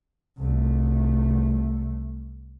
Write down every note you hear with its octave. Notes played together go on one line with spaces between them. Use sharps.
C2 A3